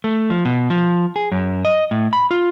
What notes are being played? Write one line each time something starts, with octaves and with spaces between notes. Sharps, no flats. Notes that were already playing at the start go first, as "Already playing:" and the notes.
A3
F3
B2
F3
G#4
F#2
D#5
A2
B5
F4